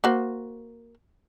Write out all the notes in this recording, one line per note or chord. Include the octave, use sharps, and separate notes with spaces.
A#3 F#4 C5